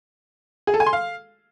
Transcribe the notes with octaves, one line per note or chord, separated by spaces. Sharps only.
G#4
A4
G#5
C6
F5